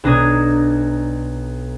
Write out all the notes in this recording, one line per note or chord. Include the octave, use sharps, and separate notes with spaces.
B1 D4 A#5 D#6 G#6